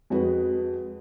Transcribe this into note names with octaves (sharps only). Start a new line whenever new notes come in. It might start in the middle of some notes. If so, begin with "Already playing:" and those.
F2 G#3 F#4 B4